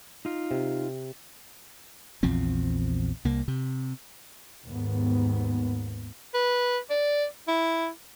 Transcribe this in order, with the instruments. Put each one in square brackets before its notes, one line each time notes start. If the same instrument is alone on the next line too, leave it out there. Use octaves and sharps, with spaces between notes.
[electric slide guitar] D#4 F4
[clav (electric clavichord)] C3
[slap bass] A#1 E2 F3 C4
C2 A#3
C3
[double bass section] D#2 G#2 B3
[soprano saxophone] B4
D5
E4